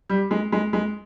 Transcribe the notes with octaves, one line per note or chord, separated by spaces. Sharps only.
G3
G#3
G#3
G#3